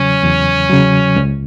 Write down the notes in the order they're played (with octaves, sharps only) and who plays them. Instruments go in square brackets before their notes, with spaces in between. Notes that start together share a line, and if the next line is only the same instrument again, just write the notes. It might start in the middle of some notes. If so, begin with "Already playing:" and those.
Already playing: [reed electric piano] E2 C#3 F#3 [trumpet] C#4
[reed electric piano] E2
C#3 F#3
C#2